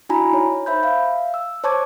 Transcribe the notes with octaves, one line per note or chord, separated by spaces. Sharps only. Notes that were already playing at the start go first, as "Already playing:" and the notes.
D4 E4 F#4 G#5 A#5 B5
D#4 C#5
C5 E5 B5 G6
E5 F5
E6
C5 C#5 A5 C#6 D6 G#6